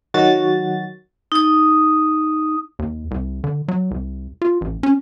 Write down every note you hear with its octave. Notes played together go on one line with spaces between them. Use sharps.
D#3 F#3 F#4 A6
D#4 D#6
D#2
C2
D3
F#3
C2
F4
A1
C#4